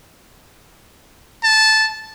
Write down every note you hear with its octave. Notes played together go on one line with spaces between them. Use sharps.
A5